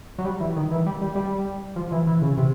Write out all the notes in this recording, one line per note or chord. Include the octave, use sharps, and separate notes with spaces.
F#3
G3
E3
D#3
E3
G3
G3
G3
F3
E3
E3
C#3
C3